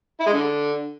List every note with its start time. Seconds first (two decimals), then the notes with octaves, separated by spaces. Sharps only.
0.20 E4
0.27 G#3
0.33 D3